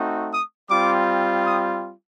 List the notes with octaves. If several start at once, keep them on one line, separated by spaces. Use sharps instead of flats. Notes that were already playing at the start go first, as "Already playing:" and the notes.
Already playing: A3 C4 D#4 F#4
D#6
G3 C4 F4 D6
D#6